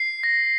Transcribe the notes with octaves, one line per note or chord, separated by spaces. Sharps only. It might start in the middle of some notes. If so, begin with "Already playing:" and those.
Already playing: C7
A#6